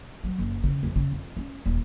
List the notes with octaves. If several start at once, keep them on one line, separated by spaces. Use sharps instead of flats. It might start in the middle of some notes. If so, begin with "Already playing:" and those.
F#3
F#1
C#3
F2
C#3
F2
C#4
D#1